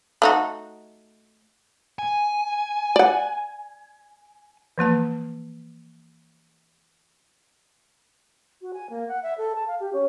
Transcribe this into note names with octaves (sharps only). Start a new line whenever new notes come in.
A3 D#4 F#4
G#5
D5 F#5
E3 F3 A#3 A5
F#4
G#5
A#3
F#5
E5
A4
A5
F5
G4
C#4